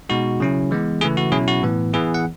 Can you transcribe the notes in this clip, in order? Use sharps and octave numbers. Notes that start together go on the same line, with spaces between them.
B2 G#3 D#4 F#4
C#3 F#3 C#4 E4
E3 G#3 B3
C#3 E3 A3 E4 G#4
F#4
B2 F#3 C#4 E4 G#4
F#4
A2 E3 B3
E3 B3 E4 G#4
F#5